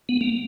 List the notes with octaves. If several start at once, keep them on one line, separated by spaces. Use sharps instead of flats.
B3
A#3